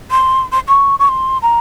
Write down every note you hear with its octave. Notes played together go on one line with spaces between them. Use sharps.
C6
C6
C#6
C#6
C6
A#5